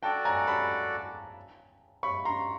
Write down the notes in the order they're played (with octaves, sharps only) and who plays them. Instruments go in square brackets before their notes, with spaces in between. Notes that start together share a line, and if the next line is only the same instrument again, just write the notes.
[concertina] F#4 A4 D5 [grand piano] G5 A5
[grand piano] G#5 A#5
A5 B5
B5 C#6
A#5 C6